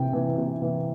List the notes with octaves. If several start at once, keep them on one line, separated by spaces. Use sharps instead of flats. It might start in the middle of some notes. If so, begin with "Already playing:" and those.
Already playing: C3 E3 G5
E3
C3
E3